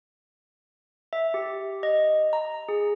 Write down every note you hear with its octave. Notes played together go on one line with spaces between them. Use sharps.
E5
G4
D#5
A#5
G#4